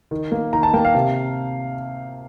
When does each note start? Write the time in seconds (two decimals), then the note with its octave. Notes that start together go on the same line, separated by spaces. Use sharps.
0.11 D#3
0.32 A#3
0.53 D#3 A#5
0.63 A5
0.74 A#3 G5
0.85 F5
0.95 C3